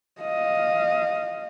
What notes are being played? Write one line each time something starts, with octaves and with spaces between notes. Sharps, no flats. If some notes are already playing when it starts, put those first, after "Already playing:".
D#5 F5